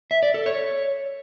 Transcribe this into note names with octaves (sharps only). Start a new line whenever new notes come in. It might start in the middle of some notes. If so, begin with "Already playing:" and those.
E5
D5
A4
C#5